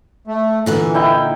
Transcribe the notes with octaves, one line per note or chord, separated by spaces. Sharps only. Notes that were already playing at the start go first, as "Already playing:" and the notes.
A3
A#2 D3 E3 F#5
D#4 E4 G5